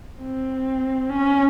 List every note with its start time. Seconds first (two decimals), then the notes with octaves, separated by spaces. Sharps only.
0.21 C4
1.10 C#4